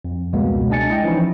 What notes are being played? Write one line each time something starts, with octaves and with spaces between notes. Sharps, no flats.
F2
C#2 B2 G3 G#3 A#3 B3
G#3 D4 D#5 G#5 A6 C#7
E4 D#5 G5
E3 F3 C#4 D#4 E4